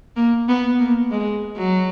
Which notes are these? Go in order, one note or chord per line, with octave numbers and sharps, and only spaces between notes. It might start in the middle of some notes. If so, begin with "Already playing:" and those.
A#3
B3
A#3
G#3
F#3